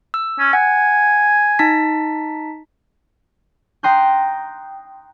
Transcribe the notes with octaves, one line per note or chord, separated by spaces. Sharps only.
E6
C#4
F#5 G#5
D#4 A5 B6
G5 A#5 C6 D#6 F#6 G6